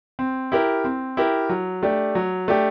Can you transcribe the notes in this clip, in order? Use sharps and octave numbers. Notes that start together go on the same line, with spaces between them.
C4
E4 G4 A#4
C4
E4 G4 A#4
F#3
A3 D4 G4
F#3
A3 D4 G4